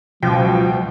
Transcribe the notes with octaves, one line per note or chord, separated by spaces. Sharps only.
C#2 B2 F3 F#3 G5